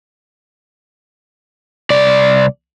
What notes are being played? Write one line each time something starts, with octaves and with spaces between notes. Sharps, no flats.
C2 D5